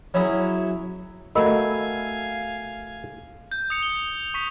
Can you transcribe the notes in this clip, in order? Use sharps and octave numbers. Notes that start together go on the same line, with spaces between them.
F#3 C#4 E4 G#4
A3 F#4 A#4 D#5 F5 G#5 B5 E6
G6
D#6 C#7 F7
G7
C#6 B6 F7